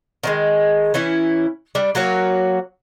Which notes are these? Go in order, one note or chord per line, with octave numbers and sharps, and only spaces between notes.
D#3 F#3 G#3
E3 C#4 E4
G3 D4
F#3 A#3 F#4 C#5